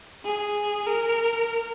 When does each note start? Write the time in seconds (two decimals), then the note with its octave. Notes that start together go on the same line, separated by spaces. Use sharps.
0.25 G#4
0.86 A#4